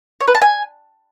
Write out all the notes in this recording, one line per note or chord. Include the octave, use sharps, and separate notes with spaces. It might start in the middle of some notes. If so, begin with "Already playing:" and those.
C#5
B4
A5
G#5